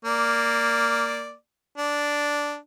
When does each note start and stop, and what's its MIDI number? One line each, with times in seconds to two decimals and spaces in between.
0.05 1.33 58
0.05 1.33 74
1.78 2.57 62